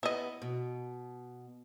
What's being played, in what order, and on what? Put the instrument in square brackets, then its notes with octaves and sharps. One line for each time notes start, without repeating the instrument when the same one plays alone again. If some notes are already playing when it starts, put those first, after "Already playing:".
[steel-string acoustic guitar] B3 [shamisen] E4 D#5
[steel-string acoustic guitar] B2